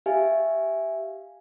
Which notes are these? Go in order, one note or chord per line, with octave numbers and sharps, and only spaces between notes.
G4 E5 F5 G#5